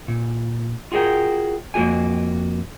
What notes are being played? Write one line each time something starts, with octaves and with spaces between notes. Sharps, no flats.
A#2
F4 F#4 G#4 A#4 G5
F2 A#3 F#4 G4 G#5